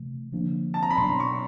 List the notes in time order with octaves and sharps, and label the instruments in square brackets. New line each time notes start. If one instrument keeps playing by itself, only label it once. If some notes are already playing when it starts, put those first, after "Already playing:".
Already playing: [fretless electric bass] C3 E3 A3
D3 F3 A#3 D4
[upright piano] A5
A#5
B5
[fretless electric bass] B2 F#3 B3 D4 [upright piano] C6
[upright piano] C#6